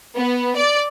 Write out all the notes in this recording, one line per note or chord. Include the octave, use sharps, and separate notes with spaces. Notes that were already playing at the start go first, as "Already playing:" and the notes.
B3
D5